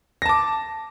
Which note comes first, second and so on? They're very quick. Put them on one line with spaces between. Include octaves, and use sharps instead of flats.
A#6 A5 D6